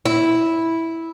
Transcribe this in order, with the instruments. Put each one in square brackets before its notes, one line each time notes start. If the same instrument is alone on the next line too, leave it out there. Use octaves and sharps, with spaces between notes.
[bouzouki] E4